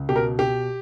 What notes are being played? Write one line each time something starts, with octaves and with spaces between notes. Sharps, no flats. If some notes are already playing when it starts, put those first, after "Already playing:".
Already playing: C#2
B2 G4
A#4
B2 G4